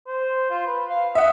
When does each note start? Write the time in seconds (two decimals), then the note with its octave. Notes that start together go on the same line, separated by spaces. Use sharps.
0.07 C5
0.50 F4
0.66 B4
0.89 F5
1.15 D#5 E5 F#5